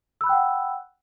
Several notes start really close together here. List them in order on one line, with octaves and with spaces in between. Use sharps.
E6 B5 F#6 G5 F#5